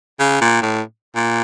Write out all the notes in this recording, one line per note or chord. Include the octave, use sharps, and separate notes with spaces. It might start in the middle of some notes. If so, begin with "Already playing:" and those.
C#3
A#2
A2
A#2